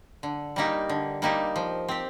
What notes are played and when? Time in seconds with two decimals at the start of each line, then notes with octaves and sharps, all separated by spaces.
0.23 D3
0.56 G3 A#3 D#4 G4
0.89 D3
1.22 G3 A#3 D#4 G4
1.56 F3
1.88 C4 G4